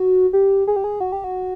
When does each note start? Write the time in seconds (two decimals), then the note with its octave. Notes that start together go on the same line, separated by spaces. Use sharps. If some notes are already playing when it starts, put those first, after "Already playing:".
Already playing: F#4
0.33 G4
0.67 G#4
0.76 G4
0.84 G#4
1.00 F#4
1.12 G4
1.24 F#4